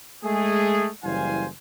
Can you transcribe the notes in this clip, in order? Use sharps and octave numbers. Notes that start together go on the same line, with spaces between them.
G#3 A3 G#4
F#1 E3 G3 C5 F5 G#5